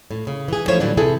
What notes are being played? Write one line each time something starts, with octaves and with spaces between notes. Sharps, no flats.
A2
C#3
E3 G#4
F3 A3 C#4 E4 C5 C#5
A2 D3 E3 F#3 G3 D4
C3 E3 E4 G#4 A4